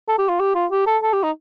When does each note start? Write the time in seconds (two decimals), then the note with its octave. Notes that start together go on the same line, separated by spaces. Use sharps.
0.08 A4
0.19 G4
0.29 F4
0.40 G4
0.55 F4
0.71 G4
0.87 A4
1.03 A4
1.13 G4
1.23 D#4